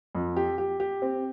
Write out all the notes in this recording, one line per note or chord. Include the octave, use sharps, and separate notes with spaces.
F2
G4
G4
G4
C4